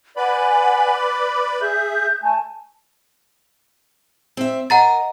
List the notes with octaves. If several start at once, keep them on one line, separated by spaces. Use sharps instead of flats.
B4 D5 F#5 G#5 B5
D6
G#4 E5 G6
A3 G#5 A5
C4 E5
A#4 D#5 F#5 A#5 A6